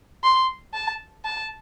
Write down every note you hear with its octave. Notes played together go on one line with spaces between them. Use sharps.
C6
A5
A5